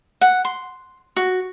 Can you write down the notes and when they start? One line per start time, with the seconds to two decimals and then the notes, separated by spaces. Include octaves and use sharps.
0.21 F#5
0.45 C6
1.17 F#4